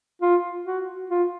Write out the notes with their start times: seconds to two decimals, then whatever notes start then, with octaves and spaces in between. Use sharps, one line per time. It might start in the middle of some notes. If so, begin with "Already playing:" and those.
0.22 F4
0.66 F#4
1.10 F4